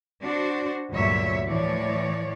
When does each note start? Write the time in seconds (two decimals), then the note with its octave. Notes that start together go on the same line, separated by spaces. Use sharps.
0.22 D4 F#4 C5
0.91 D2 G2 A#2 F#3 C#5 E5
1.46 A2 E3 F3 C#5 D5